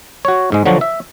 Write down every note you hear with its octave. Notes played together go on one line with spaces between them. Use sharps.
F#4 C#5
G#2 G#3
D3 F3 F#3 F#4
E5